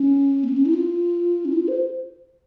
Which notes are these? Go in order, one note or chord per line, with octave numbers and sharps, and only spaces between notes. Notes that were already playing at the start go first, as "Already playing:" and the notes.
Already playing: C#4
A#3
C4
C#4
E4
F4
C#4
E4
F4
C5